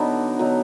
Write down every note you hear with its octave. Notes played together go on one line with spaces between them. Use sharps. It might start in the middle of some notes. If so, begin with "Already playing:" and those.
Already playing: D3 F#3 B3 D#4
D3 F#3 B3 D#4